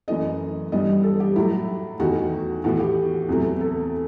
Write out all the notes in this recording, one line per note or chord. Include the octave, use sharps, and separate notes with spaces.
F#2 E3 A3 D#5
G2 E3 G3 B3 D#5
A4
G4
A2 F#3 A3 E4
E2 D#3 A3 F#4
A2 E3 B3 F#4
G4
E2 C3 F#3 A3
A4